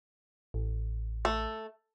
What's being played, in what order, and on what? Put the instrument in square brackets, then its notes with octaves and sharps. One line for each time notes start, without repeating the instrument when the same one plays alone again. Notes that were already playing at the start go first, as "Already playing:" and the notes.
[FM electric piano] A1
[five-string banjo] A3